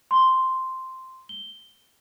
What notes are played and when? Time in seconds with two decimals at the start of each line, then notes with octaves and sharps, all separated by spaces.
0.11 C6
1.29 G7